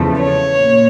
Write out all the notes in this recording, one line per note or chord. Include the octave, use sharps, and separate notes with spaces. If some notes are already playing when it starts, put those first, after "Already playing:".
Already playing: E2 C#3 F3 A3
C#5
A#2